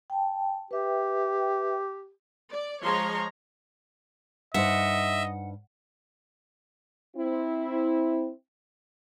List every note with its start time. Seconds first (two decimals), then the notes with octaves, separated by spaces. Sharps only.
0.10 G5 A5
0.71 G4 B4 E5 G5
2.53 D5
2.82 F3 G#3 C#5 A#5 C6
4.54 G2 D#4 C5 D#5 E5 F#5
7.16 C4 E4